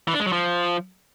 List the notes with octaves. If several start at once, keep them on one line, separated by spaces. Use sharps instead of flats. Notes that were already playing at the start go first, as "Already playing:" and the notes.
E3
D4
G#3
F#3
F3